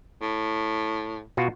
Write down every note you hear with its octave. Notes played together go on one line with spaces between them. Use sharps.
A2
B2 F4 F#4